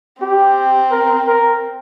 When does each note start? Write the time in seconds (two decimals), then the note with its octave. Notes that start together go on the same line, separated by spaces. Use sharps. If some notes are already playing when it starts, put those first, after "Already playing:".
0.22 C4 G4
0.91 A#4
1.27 A#4